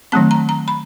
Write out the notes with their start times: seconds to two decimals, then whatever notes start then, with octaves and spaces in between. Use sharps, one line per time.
0.12 D#3 F#3 A3 C4 A5
0.31 A#5
0.49 A#5
0.68 B5